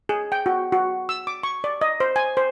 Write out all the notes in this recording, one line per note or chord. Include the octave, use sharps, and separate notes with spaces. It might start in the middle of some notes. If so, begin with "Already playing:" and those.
G#4
G5
F#4
F#4
E6
D6
C#6
D5
D#5
C5
G#5
C5